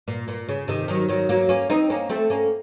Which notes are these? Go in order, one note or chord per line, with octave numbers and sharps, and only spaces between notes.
A#2
A#2
C#3
C3 D#3
D#3 F#3
D#3 F#3
F#3 A#3
A#3 C#4
C4 D#4
A#3 C#4
A3 C4
A#3 C#4